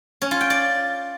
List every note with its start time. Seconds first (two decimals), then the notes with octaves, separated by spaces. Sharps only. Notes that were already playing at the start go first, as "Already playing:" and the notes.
0.22 C#4
0.31 F4
0.41 G5
0.50 D5